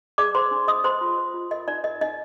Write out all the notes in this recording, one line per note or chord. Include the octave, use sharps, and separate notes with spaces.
G#4 D5 D6
C5 C6
D4
D4 D#5 D#6
C5 C6
F4
C5
F4
A#4 D#5
D#4 D5
A#4 D#5
D#4 D#5